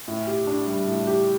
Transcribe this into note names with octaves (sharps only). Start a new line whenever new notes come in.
A2
G4
D4
G3
A2
G4